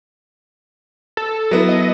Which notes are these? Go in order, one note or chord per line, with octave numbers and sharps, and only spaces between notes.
A4
F#3 B3 E4
D#5